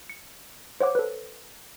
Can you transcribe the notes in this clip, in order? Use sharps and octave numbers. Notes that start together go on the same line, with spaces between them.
C#7
C5 C#5 F#5 D6
A4 B4